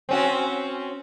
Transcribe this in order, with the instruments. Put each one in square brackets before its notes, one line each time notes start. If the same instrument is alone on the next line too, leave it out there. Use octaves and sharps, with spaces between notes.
[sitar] C4 C#4 F#4